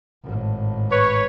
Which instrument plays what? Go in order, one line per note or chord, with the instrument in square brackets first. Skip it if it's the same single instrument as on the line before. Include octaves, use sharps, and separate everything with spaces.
[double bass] G#1 A2
[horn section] B4 C#5